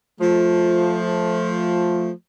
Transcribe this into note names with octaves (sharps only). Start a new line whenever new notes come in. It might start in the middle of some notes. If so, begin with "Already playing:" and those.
F3 A3